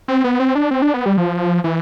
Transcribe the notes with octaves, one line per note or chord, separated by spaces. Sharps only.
C4
B3
C4
D4
C4
D4
B3
G3
F3
E3